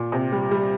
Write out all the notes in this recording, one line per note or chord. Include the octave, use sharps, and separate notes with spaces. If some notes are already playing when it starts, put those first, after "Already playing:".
Already playing: A#2
C3
G3
G3